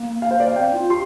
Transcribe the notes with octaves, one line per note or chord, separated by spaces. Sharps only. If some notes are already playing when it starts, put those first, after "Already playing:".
Already playing: A#3
F5
C5
D5
F5
C4 G5
F4
G4 C6